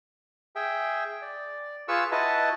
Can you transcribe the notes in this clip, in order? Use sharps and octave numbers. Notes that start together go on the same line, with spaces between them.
G#4 E5 G5
D5
F4 G#4 B4 C#6 E6
E4 F#4 B4 D#5 A5